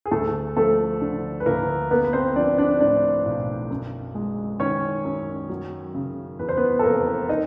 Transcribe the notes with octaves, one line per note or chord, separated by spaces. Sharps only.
G#4
D2 A3 A4
F3 A3 A4
D3
B4
D2 A#3 A#4
A#3 B3 B4
B4
C4 C5
F3 D4 D5
D4 D5
A2 D4 D5
B1
F#2
G#3
D#3 C#4 C#5
F#2
F#3
C#3
E2 B4
C5
B3 B4
A4
F1 A#3 A#4
D#4 D#5